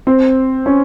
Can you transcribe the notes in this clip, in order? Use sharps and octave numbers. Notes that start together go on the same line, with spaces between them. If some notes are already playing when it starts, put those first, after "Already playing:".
C4
C#4